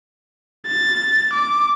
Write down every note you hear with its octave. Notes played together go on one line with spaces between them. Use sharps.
A6
D6